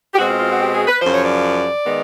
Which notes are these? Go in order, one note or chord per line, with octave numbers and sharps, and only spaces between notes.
G4
B2 G#3 C4 F#4
F4
F4
F#4
G4
G#4
B4
F#2 C#3 F3 C5
C#5
D5
D#3 G#3 B3